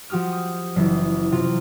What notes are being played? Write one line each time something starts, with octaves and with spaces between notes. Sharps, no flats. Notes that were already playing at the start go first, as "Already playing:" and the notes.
F3 F#4 G4 D#6 F6
D#6
F#1 E3 E5 D#6 C7
C3 F4 F6